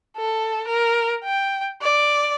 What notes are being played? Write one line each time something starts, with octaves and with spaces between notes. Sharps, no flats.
A4
A#4
G5
D5